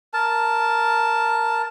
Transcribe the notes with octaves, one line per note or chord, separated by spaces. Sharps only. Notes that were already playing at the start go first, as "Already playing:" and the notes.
A#4 A5